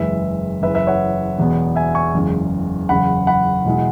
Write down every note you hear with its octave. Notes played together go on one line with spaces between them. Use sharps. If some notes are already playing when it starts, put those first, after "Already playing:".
Already playing: F#1 E2 E3 G#3 E4 B4 E5
F#1 E2 E3 B4 E5
B4 E5
C#5 F#5
E1 E2 B2 B3
E5 G#5
G#5 C#6
F#1 E2 C#3 G#3
F#1 E2 C#3 F#5 B5
F#5 B5
E2 B2 G#3 E4